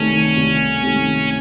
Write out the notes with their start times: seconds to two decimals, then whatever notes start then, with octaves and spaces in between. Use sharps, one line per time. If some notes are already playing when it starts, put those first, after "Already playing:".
Already playing: C2 C3 D#3 A3 C#4
0.37 C2
0.83 C3 D#3 A3